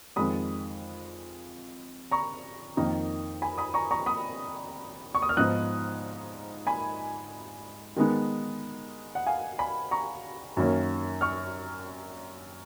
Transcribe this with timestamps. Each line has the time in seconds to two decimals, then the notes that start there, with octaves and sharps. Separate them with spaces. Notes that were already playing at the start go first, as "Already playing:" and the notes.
0.16 F2 D#3 G#3 B5 D#6
2.11 A#5 C#6
2.77 F2 D#3 A#3 D#4
3.42 G#5 B5
3.58 B5 D#6
3.74 A#5 C#6
3.91 A#5 C#6
4.06 B5 D#6
5.15 C#6
5.22 D#6
5.29 F6
5.37 G#2 F3 B3 D#4 D#6 F#6
6.67 G#5 B5
7.96 D#3 G#3 B3 D#4
9.15 F#5
9.27 F5 G#5
9.59 G#5 B5
9.91 A#5 C#6
10.57 F#2 D#3 A#3 C#4
11.21 C#6 F6